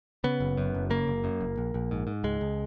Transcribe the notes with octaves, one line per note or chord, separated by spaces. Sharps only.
C#3 B3
F#1
F#2
F#1
C#3 A#3
F#1
F#2
F#1
A#1
A#1
G#2
G#2
C#2 G#3
C#2